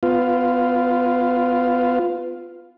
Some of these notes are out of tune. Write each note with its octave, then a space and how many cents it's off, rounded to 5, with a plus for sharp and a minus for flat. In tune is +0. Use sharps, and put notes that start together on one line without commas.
B3 +25 F4 +0